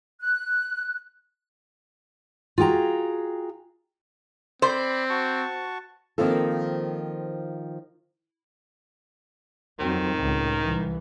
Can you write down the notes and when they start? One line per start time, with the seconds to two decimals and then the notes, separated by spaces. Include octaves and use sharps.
0.21 F#6
2.58 F4 F#4 G#4 G5 A#5
4.62 C4 C5 D5 B5
5.10 F#4 A5 C#6
6.18 D#3 F3 A#3 C4 F4 A4
9.80 F2 D#3 F#3 C4
10.15 C#2 A2
10.61 C2 E3